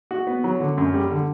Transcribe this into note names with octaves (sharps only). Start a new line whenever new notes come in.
F#4
B3
F#3
D3
F#2
G3
D3